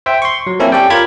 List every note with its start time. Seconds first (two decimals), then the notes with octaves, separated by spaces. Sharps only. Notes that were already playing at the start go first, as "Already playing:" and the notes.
0.06 C5 E5 G5
0.22 C6 C#6
0.47 F#3
0.60 A#3 C4 C#4 E4 A4
0.72 C#4 G4 A4 D5 G5
0.90 F4 A#4 B5 G#6